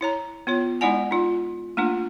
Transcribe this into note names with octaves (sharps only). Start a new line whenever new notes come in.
E4 C#5 A#5
B3 F4 C#5
G#3 D#4 E4 D5 F#5 G#5
D#4 F4
A3 A#3 D4 F4